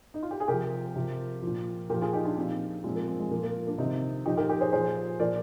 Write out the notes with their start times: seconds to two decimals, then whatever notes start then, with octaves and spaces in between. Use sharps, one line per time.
0.14 D#4
0.23 F4
0.31 G4
0.40 G#4
0.48 C3 F3 G4 A#4
0.96 C3 F3
1.42 A#2 F3
1.90 A#2 F3 G4 A#4
2.02 F4 G#4
2.13 D#4 G4
2.25 D4 F4
2.37 A#2 F3 C4 D#4
2.84 A#2 F3 G#3 C4
2.96 A#3
3.08 G#3 C4
3.20 G#3
3.31 A#2 F3 A#3
3.43 A#3
3.67 A#3 D4
3.78 C3 D#3 C4 D#4
4.26 A#2 F3 D#4 G4
4.37 G4 A#4
4.49 G4 A#4
4.61 G#4 C5
4.73 A#2 F3 G#4 C5
5.20 A#2 F3 A#4 D5